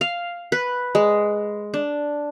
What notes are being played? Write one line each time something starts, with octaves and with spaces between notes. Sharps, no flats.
F5
B4
G#3
D4